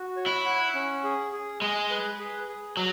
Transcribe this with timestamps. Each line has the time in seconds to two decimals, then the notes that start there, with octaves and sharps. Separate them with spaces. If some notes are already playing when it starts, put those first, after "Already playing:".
Already playing: F#4
0.17 C#5
0.26 E4
0.46 F#5
0.75 C#4
1.04 G#4
1.32 G#4
1.62 G#3 G#4
1.91 B4
2.19 G#4
2.48 G#4
2.77 F#3